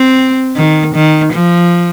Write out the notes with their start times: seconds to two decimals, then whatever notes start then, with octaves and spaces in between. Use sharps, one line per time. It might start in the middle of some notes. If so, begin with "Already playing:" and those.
Already playing: C4
0.56 D#3
0.94 D#3
1.33 F3